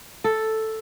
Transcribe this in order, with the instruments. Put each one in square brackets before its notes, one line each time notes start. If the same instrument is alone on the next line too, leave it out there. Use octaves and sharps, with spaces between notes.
[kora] A4